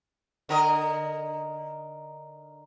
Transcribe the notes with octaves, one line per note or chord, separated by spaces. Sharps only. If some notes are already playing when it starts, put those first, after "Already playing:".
D3 A#4 D#5